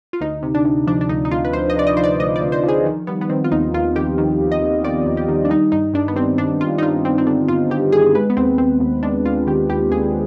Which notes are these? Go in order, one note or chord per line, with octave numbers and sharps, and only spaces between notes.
F4
D2 D#4
C3
D4
C3
F3 D4
D4
D2 D#4
D#4
D2 F4
B4
D2 C5
D#5
C3 D5
D#5
F3 C5
D5
D2 D#5
D5
D2
C5
F3 G#4
D#3
G3 B3
B3
D#3 C4
F4
D#2 D#4
D#2 F4
D#3 G4
D#3
D#2
D#5
D#2
D#3 D5
D#2
G4
D#3
D4
G3 D#4
G2 D#4
G2 D4
B3
G3 C4
G2 D4
G2 F4
D#4
G3 F4
G3 C4
C4
D3 D4
G2 F4
G2 G4
G2 G#4
G#3 B4
B3
D#2 C4
D#2 C4
D#2
G#3 D4
D#2 F4
D#3 G4
D#2 G4
D#2 G#4